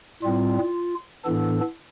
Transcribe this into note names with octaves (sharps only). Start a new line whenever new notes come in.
A2 G3 C4 F4
A2 E3 B3 D4 A4